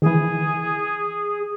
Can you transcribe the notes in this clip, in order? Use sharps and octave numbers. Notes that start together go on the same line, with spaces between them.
D#3 E3 G#4